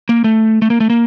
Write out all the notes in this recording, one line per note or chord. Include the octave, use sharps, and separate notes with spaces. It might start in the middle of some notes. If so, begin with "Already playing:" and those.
A#3
A3
A3
A#3
A3
A#3